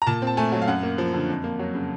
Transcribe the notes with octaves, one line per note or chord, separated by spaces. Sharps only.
A#5
A#2 A5
C4 A5
A3 G#5
F#3
F5
F#2 F#5
A#3
F3
D3
F2
A#3
F#3
C#3